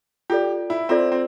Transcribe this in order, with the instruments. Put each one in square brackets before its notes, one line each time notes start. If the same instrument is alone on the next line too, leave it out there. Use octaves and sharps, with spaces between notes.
[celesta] F4 A4 D5 [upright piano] G4
[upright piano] E4
[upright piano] C4 [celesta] F4 A4 D5
[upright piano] C4